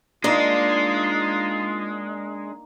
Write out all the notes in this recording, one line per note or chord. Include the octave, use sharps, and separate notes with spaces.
G#3 A#3 D4 D#4 F4